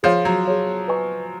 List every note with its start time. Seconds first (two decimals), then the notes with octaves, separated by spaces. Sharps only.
0.03 F3 G#4 C#5 F5
0.25 F#3
0.45 G#4 C#5 F5
0.88 B4 D#5 G#5 C#6